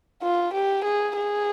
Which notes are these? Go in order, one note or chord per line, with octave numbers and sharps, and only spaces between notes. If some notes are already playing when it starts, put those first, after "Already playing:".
F4
G4
G#4
G#4